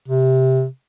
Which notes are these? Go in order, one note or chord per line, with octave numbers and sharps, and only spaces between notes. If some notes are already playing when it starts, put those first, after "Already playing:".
C3